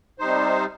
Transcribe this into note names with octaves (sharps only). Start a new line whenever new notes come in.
C3 G3 D#4 C5